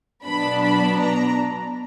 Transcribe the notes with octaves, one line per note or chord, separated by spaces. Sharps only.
B2 F#3 B3 D4 B5
B5
A#5